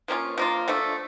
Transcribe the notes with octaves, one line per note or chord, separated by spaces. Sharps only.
F3 A#3 C#4 F4
F3 A#3 F4
D3 F3 A3